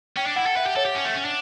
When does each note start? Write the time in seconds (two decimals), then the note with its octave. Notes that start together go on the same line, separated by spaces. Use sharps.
0.17 C#4 G5
0.26 D4
0.36 E4 F#5
0.46 A4
0.56 B4 E5
0.66 G4
0.76 A4 C#5
0.85 G4
0.95 C#4
1.05 A3
1.16 C#4
1.25 D4